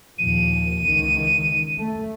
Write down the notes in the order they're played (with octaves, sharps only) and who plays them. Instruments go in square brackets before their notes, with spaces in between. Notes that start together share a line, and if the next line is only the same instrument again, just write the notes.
[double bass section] D#2 A#2 F3 [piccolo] D#7
[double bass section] C#2 D#3 E3
A3